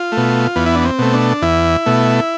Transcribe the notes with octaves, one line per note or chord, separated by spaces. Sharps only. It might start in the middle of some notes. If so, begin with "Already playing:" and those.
Already playing: F4
A3
B2
E2 B3
E4
D4
C4
B2 A3
D4
E2 E4
B2 A3